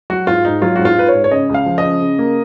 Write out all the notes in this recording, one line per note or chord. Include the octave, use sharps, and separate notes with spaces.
F#3 F#4
G#2 F4
G#2 D#4
F#3 F4
G#2 F#4
F4
G#2 B4
C#5
G#2
C#5
C#3 D#5
C#2 F5
F3
D#5
C#3
C#3
A#3